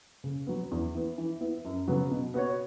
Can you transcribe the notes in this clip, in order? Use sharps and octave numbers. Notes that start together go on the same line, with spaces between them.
C#3
F#3 B3
E2
E3 B3
E3
B3 E4
F#2
C#3 F#3 B3 F#4
B2
B3 F#4 C#5